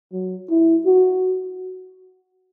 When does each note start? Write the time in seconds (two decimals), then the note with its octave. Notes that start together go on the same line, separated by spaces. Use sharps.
0.13 F#3
0.50 E4
0.86 F#4